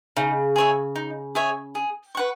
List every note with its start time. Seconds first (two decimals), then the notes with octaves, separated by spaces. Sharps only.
0.16 C#3 D#4
0.56 G#4 C#5 E5
0.96 D#4
1.35 G#4 C#5 E5
1.75 G#4
2.15 B4 F#5 C#6